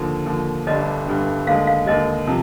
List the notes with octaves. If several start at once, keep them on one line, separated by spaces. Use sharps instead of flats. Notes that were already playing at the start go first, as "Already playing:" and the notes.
Already playing: D#2 D3 F3
D#2 D3 F3
G1 G2 D3 G3 D4 D#5
G1 G2 D3 G3 D4
D#2 D3 G#3 F5
F5
D#2 D3 G#3 D#5
C3 F3